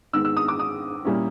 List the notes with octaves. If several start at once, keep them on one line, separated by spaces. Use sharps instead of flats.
G#2 D#3 G#3 B3 E6
E6
D#6
D6
D#6
A#2 G3 A#3 C#4 E4